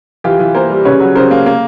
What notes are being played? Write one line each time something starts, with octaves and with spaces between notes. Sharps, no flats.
E3 F4 G4
E3
A#3 A#4 C5
G3
C#3 B4 C#5
F#3
C#3 A#4 C5
A#3
A#3